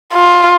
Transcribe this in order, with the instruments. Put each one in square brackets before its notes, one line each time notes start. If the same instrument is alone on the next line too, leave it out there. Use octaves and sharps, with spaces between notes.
[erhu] F4